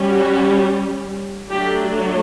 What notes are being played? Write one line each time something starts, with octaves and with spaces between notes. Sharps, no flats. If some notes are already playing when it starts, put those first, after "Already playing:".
Already playing: G3 C#4
F#4
F#3 A3 D4 G4